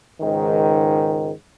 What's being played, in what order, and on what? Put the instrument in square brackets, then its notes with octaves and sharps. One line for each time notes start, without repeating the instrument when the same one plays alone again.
[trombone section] C#2 G#2 D#3